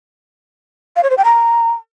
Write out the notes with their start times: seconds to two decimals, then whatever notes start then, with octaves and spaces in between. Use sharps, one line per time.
0.96 F5
1.03 C#5
1.10 C5
1.17 G5
1.24 A#5